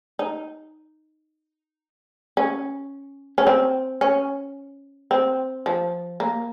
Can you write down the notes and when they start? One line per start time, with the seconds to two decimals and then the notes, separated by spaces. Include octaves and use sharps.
0.19 D#4
2.37 C#4
3.38 C#4
3.47 C4
4.01 C#4
5.11 C4
5.66 F3
6.20 A#3